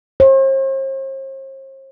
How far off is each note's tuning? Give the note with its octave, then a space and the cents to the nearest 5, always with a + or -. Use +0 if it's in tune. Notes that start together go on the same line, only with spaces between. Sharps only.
C5 +45